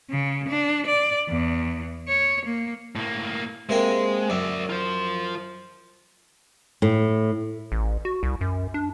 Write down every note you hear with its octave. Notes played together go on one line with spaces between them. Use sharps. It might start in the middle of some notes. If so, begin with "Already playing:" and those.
C#3
D4
D5
E2
C#5
A#3
A2 A#3
C3 G#3 A#3 C4
F#2 D5 E5
F4 C5
A2
A1
F#4
C2
F#2
D4